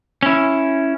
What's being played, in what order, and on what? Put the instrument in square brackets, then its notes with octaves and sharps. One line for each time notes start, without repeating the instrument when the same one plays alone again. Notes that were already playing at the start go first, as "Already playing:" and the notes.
[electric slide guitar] C#4 E4